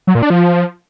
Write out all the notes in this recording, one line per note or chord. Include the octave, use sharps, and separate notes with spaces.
F#3
A#2
D4
F3